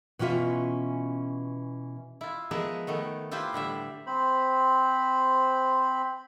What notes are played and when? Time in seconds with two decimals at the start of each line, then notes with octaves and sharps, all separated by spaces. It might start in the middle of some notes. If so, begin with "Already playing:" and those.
0.19 B2 E3 C#4 F4 E5
2.21 E4 F4
2.51 F3 G#3 B3 G#4 A#4 E5
2.87 D#3 A3 B3
3.32 E4 F4 G4 B4 C5
3.53 A2 D3 G3 E5
4.07 C4 C5 B5